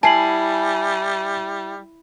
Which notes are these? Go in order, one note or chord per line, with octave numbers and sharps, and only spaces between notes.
G3 E4 G#5 A5 C7 F#7